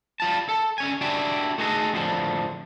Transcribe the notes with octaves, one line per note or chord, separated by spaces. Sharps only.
G3 F4 A5
A4
D3 C#4 G#5
D4 E4 F#4 G4 D5
A3 B3 D#4 F#4 G#4 A4
F2 A2 D3 F3